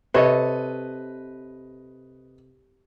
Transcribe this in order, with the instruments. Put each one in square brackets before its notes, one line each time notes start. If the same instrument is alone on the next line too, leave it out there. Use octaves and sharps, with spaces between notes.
[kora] C3 A4 C#5 [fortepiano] B4 D#5